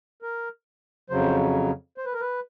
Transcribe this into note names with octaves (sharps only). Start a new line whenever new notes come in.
A#4
F2 C#3 F#3 C5
C5
B4
A#4
B4